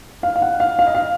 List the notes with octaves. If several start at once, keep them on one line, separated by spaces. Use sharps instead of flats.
F5
F5
F#5
F5
F5
D#5
F5